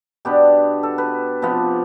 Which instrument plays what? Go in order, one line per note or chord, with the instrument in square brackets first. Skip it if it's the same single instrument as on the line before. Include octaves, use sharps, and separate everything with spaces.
[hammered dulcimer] B2 B3 D4 G4
A4
B4
C3 F3 B3